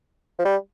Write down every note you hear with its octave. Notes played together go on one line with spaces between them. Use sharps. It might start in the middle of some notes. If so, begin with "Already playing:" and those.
F3
G3